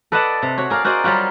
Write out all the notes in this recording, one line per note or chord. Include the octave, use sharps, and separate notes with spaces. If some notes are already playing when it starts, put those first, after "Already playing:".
A4 B4 D5 D#5 F#5 A5
C3
F#4 C#5
G#4 A#4 D5 F5
F#4 A#4 C5 D5 D#5
F#3 G3 F4 F#4